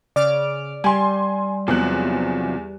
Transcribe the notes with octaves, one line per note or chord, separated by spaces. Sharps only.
C#3 D5 D6 F6
G3 G#5 C6
E2 C3 F3 F#3 F#6